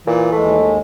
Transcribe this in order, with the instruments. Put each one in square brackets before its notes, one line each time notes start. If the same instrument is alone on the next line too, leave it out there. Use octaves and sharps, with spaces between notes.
[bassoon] A#2 [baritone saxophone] E3
[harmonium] D#2 G#3 [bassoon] A3